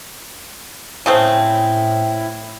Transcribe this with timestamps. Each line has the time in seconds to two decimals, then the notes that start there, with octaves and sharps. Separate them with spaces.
1.06 A2 C#3 A3 C4 E4 G5